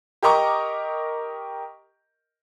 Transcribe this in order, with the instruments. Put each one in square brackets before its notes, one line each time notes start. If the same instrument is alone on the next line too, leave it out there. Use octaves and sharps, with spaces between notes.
[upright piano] G4 A#4 D#5 A#5 C#6 D6